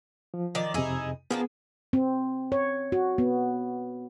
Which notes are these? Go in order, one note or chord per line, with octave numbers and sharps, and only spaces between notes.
F3
D#3 D5
F2 C3 D#4 E4 G#4
F3 A#3 B3 D4 G#4
C4
C#5
F#4
B3